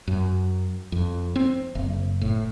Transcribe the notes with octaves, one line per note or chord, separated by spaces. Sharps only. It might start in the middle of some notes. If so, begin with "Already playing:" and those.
F#2
F2
C4
F#1
A2